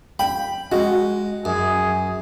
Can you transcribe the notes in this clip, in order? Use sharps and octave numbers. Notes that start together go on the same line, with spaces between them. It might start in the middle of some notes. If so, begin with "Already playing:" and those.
G5 B5
G#3 F#4
F#2 G#4